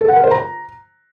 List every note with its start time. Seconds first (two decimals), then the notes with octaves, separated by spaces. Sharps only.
0.01 A4
0.08 F#5
0.16 A#4
0.24 C5
0.31 A#5